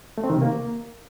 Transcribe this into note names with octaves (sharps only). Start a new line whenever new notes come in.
A3
C4
D#3
C3
A#3